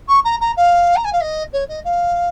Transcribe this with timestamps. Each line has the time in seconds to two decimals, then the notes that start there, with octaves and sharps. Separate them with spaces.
0.08 C#6
0.24 A#5
0.40 A#5
0.56 F5
0.96 A#5
1.04 G#5
1.12 F5
1.21 D#5
1.53 C#5
1.68 D#5
1.84 F5